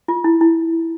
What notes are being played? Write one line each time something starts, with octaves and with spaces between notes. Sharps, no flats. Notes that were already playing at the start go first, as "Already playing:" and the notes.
F4
E4
E4